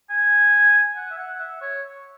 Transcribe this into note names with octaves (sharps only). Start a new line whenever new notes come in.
G#5
F#5
E5
F#5
E5
C#5